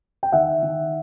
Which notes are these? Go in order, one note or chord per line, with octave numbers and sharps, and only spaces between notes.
G5
D#3 E5 F#5
D#3